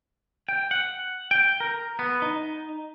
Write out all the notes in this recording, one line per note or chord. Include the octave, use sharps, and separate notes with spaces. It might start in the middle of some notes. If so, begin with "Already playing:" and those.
G5
F#5
G5
A#4
B3
D#4